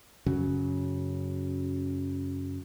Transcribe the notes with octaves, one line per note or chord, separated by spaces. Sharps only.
F#2 C#3 F#3